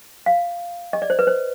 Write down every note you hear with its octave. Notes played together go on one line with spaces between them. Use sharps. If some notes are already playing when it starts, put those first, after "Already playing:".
F5
D#5
D5
C5
B4
C5